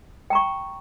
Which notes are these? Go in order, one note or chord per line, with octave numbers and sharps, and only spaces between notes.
G5 A#5 C#6